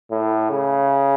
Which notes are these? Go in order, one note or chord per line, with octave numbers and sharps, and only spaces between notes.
A2
C#3